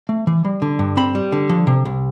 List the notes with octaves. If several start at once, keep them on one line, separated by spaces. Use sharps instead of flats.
A3
E3
G3
D3
G2
C4 B5
G3
D3
F3
C3
C2